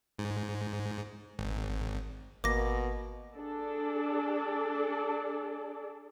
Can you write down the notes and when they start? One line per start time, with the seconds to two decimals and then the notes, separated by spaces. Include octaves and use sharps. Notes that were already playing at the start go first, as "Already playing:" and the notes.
0.19 G#2
1.39 G#1
2.44 G#1 B2 A#3 D6 A#6
3.35 D4 G#4 A4 D5